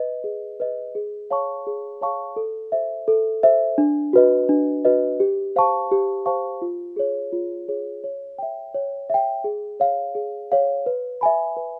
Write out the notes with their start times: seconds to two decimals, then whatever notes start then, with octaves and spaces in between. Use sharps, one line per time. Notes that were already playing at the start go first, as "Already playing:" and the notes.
Already playing: B4 D#5
0.24 G#4
0.60 B4 D#5
0.95 G#4
1.30 C#5 F5 A5 C#6
1.67 G#4
2.01 C#5 F5 A5 C#6
2.36 A4
2.72 C5 E5
3.08 A4
3.43 C5 E5
3.78 D4
4.13 F#4 B4 D#5
4.49 D4
4.85 F#4 B4 D#5
5.20 G4
5.56 C5 F5 A5 C#6
5.91 G4
6.26 C5 F5 A5 C#6
6.62 F4
6.96 G#4 C#5
7.33 F4
7.68 G#4 C#5
8.04 C#5
8.38 E5 G5
8.74 C#5
9.10 E5 G5
9.44 G#4
9.80 C#5 F5
10.15 G#4
10.52 C#5 F5
10.86 B4
11.21 E5 G#5 B5
11.57 B4